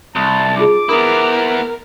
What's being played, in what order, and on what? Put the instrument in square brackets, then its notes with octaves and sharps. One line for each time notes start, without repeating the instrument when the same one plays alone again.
[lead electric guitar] C2 [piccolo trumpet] A5 [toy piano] D#6
[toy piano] D#4 F4 G#4 [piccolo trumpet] D6
[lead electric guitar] B3 E4 [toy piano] D4 D#6 [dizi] A#4